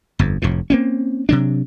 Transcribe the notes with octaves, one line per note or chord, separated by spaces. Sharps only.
G1 F2
F1 F2 A2
A#3 C4 C#4
C3 F#3 D4